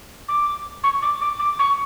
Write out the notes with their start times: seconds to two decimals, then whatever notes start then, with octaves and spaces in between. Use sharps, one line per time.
0.28 D6
0.83 C#6
1.02 D6
1.21 D6
1.39 D6
1.59 C#6